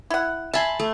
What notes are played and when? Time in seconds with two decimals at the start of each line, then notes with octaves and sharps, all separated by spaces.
0.10 E4 F#5
0.53 E5 G#5 A5 B5 C6
0.79 A3